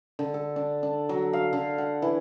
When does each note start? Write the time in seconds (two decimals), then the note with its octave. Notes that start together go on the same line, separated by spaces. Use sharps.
0.19 D3
0.34 A4
0.56 D4
0.83 D4
1.09 F#3
1.33 F5
1.53 D3
1.78 F#5
2.02 E3